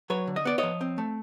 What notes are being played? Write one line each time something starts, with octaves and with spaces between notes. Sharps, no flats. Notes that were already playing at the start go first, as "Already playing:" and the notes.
F#3 B4 C#5
D3
D#5
B3 D5
F3 C#5 D#5
C4
A3